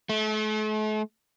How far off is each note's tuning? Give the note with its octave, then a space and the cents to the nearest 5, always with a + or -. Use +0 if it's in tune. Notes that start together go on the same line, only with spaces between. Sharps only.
A3 -40